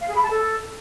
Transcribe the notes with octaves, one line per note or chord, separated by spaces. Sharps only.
F5
G#4
B5
A5
A4